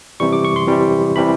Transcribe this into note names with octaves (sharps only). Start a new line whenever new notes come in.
C3 E3 G3 C#6
D6
C#6
C6
C3 E3 G3
C3 E3 G3 B5